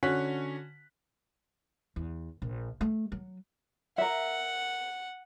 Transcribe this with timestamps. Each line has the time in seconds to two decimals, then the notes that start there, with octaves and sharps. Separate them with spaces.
0.03 D3 C#4 F#4 F#6 B6
1.96 E2
2.42 A#1
2.81 A3
3.12 F#3
3.98 A#4 E5 F#5